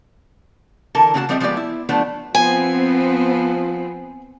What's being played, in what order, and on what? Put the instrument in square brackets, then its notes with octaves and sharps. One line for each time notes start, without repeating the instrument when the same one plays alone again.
[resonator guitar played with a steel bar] D3 E3 A4 A#4 A5
C#3 A#3 F#4 G#4 A5
F3 G3 C4 G#4 D#5 E5
F3 G#3 A3 B3 G4 D5
E4
F3 A3 B3 D4
[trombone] F3 [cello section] B3 C4 [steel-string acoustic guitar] G#5